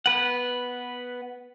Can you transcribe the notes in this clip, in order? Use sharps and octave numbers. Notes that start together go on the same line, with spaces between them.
B3 B4 F#5